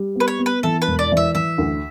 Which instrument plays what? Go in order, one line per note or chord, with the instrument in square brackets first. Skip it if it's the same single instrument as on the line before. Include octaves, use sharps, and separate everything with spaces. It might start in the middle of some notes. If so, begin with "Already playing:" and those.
Already playing: [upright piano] G3
[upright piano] B3 [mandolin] B4
[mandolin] C#5
[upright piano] B3
[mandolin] B4
[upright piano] E3 [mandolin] A4
[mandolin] B4
[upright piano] E1
[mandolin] D5
[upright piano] E3
[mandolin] E5
[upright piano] E3 [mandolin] E5
[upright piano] D2